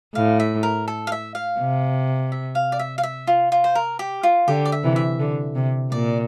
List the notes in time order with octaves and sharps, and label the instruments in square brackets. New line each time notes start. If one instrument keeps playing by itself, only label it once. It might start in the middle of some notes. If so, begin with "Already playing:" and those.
[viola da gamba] A2 [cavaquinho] F5
[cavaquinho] E5
A#4
A4
F5
E5
F5
[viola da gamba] C3
[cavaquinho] E5
F5
D5
E5
F5
E5
F4
F4
C5
A#4
G4
F4
[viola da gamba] D3 [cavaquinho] G4
[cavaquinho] D5
E5
[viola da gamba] C3 E3
[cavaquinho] E5
[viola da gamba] D3
C3
[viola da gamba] A#2 [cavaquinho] D5